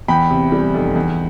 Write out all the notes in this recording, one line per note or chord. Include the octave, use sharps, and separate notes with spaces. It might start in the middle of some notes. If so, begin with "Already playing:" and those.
E2 G5 B5
C3
G3
F1
E2